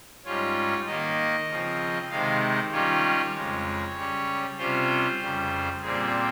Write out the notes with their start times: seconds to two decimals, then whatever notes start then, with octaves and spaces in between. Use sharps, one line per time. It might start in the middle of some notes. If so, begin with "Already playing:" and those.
0.25 G#2 G3 C#4 F4 C#5
0.87 D#3 A#3 D#4 D#5
1.49 C#3 F3 C4
2.10 C3 D#3 G#3 D#4 F5
2.72 D#3 G3 C#4 F4 C#5
3.34 F2 C#3 G#3
3.96 C#3 G3 C#4
4.58 C3 G3 C#4 F4 C5
5.20 F2 C#3 G3
5.81 A#2 G3 C4 G#4